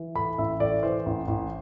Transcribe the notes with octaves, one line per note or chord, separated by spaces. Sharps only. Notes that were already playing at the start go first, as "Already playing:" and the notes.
Already playing: E3
A2 B5
A1 E5
A2 D5
E3 C5
A1
A1